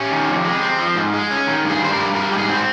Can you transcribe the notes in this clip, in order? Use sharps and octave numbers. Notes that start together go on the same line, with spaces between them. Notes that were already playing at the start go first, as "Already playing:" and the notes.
Already playing: C#4 G4
D#3
F2
G#3
C4
F3
G#2
G#3
C#4
D#3
G2
G#4
G3 C5
A#4
G2
G3 A#4
G#2 G4
G#4
C4
C5